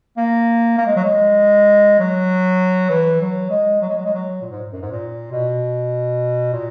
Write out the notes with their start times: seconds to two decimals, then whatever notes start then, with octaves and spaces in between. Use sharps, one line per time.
0.17 A#3
0.78 A#3
0.87 G#3
0.96 F#3
1.04 G#3
2.00 F#3
2.90 E3
3.21 F#3
3.50 G#3
3.82 F#3
3.89 G#3
3.97 F#3
4.06 G#3
4.14 F#3
4.42 A#2
4.51 G#2
4.73 F#2
4.82 G#2
4.92 A#2
5.32 B2
6.53 A#2